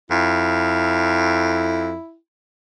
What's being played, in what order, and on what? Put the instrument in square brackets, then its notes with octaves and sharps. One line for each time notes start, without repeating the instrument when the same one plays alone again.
[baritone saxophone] F2 [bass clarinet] E4